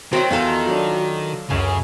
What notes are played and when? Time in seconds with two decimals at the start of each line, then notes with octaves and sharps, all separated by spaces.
0.13 D#3 F#3 G#3 C4 F#4
0.30 E2 D#4 F4 A4
0.67 F#3 D4
1.50 C#2 F#2 C#3 G#5